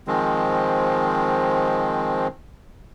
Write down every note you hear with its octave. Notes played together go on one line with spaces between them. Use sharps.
D#3 F3 G#3 C4